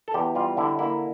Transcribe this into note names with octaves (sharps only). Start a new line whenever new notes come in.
A4
E2 G4
G3 F4
D3 E4
A#3 E4